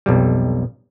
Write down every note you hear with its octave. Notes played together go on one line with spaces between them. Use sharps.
B1 F2 G3